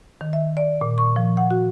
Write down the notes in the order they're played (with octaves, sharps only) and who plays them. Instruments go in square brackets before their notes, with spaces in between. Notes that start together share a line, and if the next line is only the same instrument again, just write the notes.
[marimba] D#3
E5
D5
A#2
C#6
F3
F#5
F#4